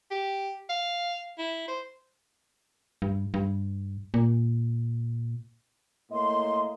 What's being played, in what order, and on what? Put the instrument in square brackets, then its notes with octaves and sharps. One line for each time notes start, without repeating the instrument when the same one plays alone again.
[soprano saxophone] G4
F5
E4
C5
[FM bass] G2
G2
A#2
[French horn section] A2 A#3 D#5 [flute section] C6